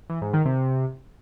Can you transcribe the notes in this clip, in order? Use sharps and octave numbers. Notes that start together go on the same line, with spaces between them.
E3
G#2
D#3
C3